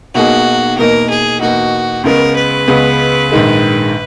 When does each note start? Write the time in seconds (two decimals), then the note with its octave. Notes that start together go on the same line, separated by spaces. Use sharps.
0.15 B1 B2 A#3 D#4 F#4 G#4
0.78 E2 B2 A#3 D#4 A#4
1.10 G#4
1.41 E2 B2 A#3 D#4 F#4
2.04 C#2 C#3 G#3 B3 A#4
2.36 B4
2.67 C#2 C#3 G#3 B3
3.31 A#1 G#2 D#3 G#3